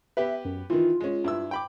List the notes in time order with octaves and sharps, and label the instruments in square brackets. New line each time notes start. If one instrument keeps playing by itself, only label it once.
[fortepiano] B3 G4 B4 [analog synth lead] E5
[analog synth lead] F#2
[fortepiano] D#3 E3 [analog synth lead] F4
[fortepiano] G#3 C#4
G2 E4 E6
G5 B5 D6